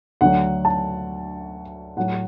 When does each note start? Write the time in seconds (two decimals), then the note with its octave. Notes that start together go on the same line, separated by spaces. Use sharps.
0.21 D2 D3 F#3 F#5
0.65 A5
1.96 A2 F#3 F#5